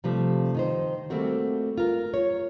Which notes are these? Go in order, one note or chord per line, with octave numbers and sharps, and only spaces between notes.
C3 F3 G3 A3
D#3 D#4 C5
G3 A3 A#3 C4 F#4
F4 A#4
C#5